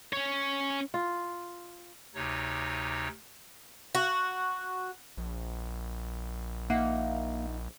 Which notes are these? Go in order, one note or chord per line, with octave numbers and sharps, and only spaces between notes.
C#4 C#5
F4
D2 C3 D#4 C#5
F#4
A#1
A#3 D#4 E5 F#5